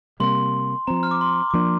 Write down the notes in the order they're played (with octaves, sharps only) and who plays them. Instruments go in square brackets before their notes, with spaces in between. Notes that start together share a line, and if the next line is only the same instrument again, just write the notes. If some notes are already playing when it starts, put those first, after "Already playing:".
[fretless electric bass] C3 G3 A#3 [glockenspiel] C6
[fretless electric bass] F3 C4 [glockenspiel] A#5
[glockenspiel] F6
D6
C6
D6
[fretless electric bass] F3 A#3 D4 [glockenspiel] C6